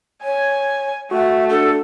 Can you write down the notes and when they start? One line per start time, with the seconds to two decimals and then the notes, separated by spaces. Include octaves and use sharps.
0.23 C#5 G#5
1.11 A3 F#4 E5 F#5
1.49 D4 A4